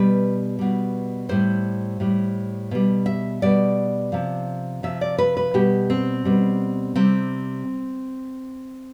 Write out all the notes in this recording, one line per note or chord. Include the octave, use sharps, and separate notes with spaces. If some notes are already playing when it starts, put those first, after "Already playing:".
Already playing: B2 G3 B4
B2 G3
A2 G3 C5
A2 G3
B2 G3
E5
B2 G3 D5
C3 F3
C3 F3 E5
D5
B4
B4
B2 G3 G4
C4
B2 G3
C3 G3 C4